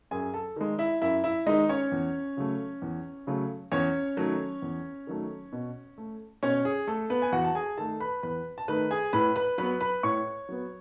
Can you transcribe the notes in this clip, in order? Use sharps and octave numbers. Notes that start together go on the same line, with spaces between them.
F#2 G#4 G#5
A4 A5
D#3 G#3
E4 E5
F#2 E4 E5
E4 E5
D#3 G#3 D#4 D#5
C#4 C#5
E2
C#3 F#3 A3
E2
C#3 F#3 A3
E2 C#4 C#5
D#3 F#3 A3
E2
D#3 F#3 A3
B2
A3
B2 C#4 C#5
G#4
A3 A4
B3 B4
G#5
E2 F#4 F#5
A5
G#4 G#5
D#3 A3 A4 A5
B4 B5
E2 B4 B5
A5
D#3 A3 B4 B5
G#4 G#5
A2 B4 B5
B4 B5
F#3 B3 B4 B5
B4 B5
A2 C#5 C#6
F#3 B3